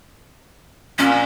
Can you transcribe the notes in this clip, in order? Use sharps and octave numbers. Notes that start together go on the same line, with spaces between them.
A#2 C#4